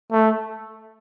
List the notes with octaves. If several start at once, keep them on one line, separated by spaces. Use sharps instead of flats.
A3